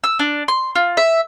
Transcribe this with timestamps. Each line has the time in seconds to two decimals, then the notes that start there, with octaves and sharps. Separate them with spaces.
0.04 E6
0.19 D4
0.48 C6
0.75 F4
0.97 E5